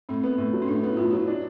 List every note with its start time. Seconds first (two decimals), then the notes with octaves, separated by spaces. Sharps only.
0.09 A2 C4
0.24 B3
0.38 A2
0.53 F#3
0.62 C#4
0.68 A2 D4
0.83 B3 E4
0.97 A2 F4
1.10 F#3 E4
1.28 D4